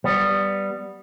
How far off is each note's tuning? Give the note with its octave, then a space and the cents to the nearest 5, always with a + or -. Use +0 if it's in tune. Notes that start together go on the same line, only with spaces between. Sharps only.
G3 +0 B3 +0